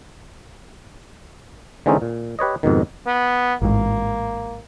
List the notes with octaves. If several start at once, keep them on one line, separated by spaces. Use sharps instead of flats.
D3 E3 G#3 C4 C#4 D#4
A#2
G4 B4 C#5 D#5
F2 G#2 B2 D#3
B3
A1 G#2 A#3